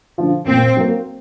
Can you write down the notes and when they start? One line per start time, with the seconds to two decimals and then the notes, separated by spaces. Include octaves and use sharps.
0.18 D3 F3
0.47 A#2 C4
0.77 F#3 A#3